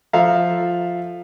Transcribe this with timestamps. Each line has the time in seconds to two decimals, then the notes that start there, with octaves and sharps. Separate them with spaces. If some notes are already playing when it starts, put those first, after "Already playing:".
0.13 F3 A4 E5 F5 A#5